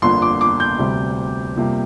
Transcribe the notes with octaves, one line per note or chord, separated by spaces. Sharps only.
G1 F2 D3 A#3 C6
D6
D6
G6
D2 C3 G3 C4
F2 C3 G3 A#3